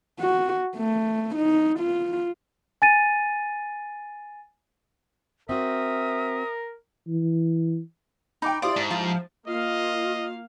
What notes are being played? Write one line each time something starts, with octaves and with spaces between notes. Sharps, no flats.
F#4
A3
D#4
F4
G#5 A6 D#7
C4 F#4 A#4 E5 D#6
E3
D#4 G5 B5 D6
E4 G4 C5 D5 F5 C6 D#6
G#2 A5
F3 A5
A#3 F4 D#5 F5